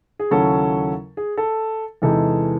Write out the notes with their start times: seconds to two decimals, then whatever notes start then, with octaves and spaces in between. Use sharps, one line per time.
0.19 G#4
0.31 D#2 C#3 F#3 C#4 E4 A4
1.17 G#4
1.38 A4
2.02 E2 C3 E3 G#3 D#4 A4